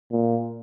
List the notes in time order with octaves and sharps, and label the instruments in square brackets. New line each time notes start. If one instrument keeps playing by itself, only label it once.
[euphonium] A#2